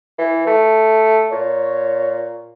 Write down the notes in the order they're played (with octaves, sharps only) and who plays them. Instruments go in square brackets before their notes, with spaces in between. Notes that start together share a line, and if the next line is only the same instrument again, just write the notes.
[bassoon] E3
A3
[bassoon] A#2 [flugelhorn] C#5